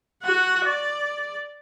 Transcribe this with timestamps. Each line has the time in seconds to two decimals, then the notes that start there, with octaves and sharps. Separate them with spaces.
0.22 F#4 F#5
0.65 D5